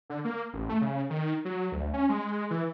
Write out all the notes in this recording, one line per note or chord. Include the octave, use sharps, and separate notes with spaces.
D3
A#3
A1
A3
C#3
D#3
F#3
D2
C#4
G#3
E3